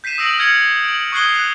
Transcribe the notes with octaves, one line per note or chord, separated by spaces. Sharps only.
G6 B6 C7 D#7 E7
D#6 E6 A#6 D7 D#7 F#7
F6 G#6 C#7
D7 F#7
C#6 D#6 F#6 G#6 C7 G7
F#6 C7